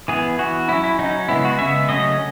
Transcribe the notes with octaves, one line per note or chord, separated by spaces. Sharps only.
E3 B3 G#4
E3 B3 F#4
F#3 C#4 E4
E4
F#3 C#4 D#4
C#3 G#3 B3 E4
F#4
C#3 G#3 B3 E5
C#3 F#3 A3 C#4 D#5